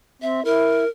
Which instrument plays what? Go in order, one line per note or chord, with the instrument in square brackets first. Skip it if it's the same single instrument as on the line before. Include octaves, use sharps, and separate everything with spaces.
[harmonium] C4 [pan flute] E5
[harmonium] E4 [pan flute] A#4